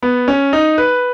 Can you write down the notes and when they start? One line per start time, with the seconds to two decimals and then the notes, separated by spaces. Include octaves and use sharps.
0.03 B3
0.28 C#4
0.53 D#4
0.78 B4